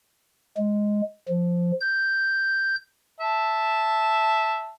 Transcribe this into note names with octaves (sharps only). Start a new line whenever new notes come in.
G#3
F3
G6
E5 A5